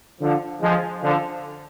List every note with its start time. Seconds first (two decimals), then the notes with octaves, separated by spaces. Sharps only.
0.21 D3 F3
0.62 F3 G#3
1.02 D3 F3